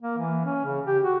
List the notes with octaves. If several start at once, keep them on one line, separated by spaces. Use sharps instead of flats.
A#3
E3
C#4
C#3
G4
F#4